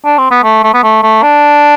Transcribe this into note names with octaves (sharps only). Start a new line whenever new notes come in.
D4
C4
B3
A3
A3
B3
A3
A3
D4